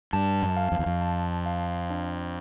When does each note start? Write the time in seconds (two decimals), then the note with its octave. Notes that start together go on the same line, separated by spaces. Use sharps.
0.13 G2 A5
0.42 F#2
0.57 F5
0.72 F2
0.79 E2
0.86 F2
1.02 A5
1.46 F5
1.90 D4